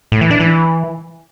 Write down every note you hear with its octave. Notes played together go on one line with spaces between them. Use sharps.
A2
E3
D4
E3